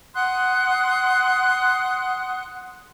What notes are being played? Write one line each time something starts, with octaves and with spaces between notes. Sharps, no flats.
F#5 C6 D#6 F#6